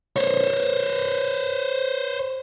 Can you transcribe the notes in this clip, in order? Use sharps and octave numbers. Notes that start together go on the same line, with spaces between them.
C5 C#5